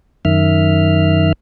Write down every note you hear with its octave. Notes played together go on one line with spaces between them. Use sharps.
F#2 D#3 E5 F6